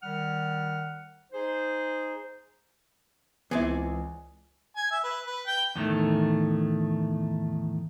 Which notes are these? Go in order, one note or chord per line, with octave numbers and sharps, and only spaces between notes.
D#3 G3 F#5 F6
D#4 G#4 C5
C#2 E3 B3 C4 E4 G#4 D5 G#5
G#5
E5
B4
B4
G5
E2 A2 D#3 A3